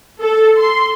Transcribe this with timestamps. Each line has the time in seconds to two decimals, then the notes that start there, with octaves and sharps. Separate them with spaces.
0.20 A4
0.57 C6